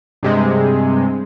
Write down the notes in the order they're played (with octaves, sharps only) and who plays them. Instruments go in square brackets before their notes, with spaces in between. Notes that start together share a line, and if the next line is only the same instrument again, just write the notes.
[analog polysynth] G2 C3 G#3